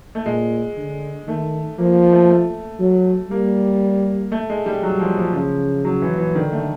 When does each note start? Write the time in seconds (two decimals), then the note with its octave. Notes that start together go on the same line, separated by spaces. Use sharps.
0.15 A3
0.26 A#2 G#3
0.77 D3
1.27 D#3 A3
1.78 F3 A#3
2.12 A3
2.29 A3
2.80 F#3
3.30 G3 A#3
4.32 A3
4.50 G#3
4.66 G3
4.82 F#3 G3
5.00 F3
5.17 F3
5.34 C#3 F3
5.85 F#3
6.02 E3
6.18 E3
6.35 D3 D#3
6.53 A3